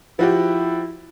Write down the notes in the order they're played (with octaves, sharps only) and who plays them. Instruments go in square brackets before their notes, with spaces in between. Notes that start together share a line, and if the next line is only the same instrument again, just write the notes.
[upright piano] F3 F#4 G4 [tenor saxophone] E4